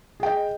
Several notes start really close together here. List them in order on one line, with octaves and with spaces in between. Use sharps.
G#4 G5 D#5